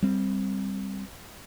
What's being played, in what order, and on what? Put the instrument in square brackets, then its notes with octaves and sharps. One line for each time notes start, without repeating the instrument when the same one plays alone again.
[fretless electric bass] G3 C4